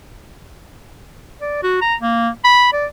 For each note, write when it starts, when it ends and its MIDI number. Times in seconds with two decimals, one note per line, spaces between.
1.41 1.60 74
1.63 1.77 66
1.81 1.95 82
2.01 2.29 58
2.44 2.72 83
2.73 2.86 74